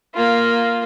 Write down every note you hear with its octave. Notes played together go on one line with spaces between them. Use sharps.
A#3 F4